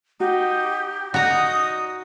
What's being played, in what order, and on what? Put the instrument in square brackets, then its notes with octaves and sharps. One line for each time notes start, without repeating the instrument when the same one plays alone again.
[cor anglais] D#4 [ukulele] F#4 [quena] G4
[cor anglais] D#4 [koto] F#4 A#5 [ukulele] D5 [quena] D#6